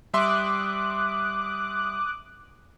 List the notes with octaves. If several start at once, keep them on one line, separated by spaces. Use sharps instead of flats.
G3 E5 C6 D6 D#6 F#6